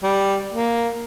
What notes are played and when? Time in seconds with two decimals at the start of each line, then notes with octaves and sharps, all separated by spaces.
0.03 G3
0.53 A#3